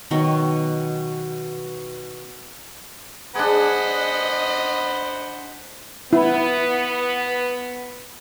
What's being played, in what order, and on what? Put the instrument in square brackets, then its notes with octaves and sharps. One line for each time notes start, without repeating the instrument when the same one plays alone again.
[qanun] B2 D#3 F#3 G5
[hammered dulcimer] D4 G#4 [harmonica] C5 F#5 B5 [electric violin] D#5
[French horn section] B3 [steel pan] E4